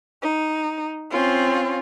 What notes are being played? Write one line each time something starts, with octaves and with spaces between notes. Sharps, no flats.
D#4
C4 C#4 F4